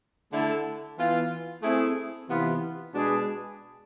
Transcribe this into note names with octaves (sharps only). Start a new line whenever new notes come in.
D3 A3 E4 A4
E3 B3 F4
A3 C4 E4 G#4
C3 E3 B3 F4 B4
B2 G#3 D4 G#4 B4